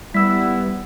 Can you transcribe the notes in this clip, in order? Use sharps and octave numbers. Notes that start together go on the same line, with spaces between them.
G3 B3 E4 E6 B6